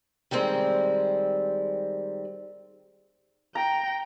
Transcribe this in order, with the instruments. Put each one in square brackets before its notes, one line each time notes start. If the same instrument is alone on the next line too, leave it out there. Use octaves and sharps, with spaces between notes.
[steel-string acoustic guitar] D#3 G3 G#3 C4
[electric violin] G5 [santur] A#5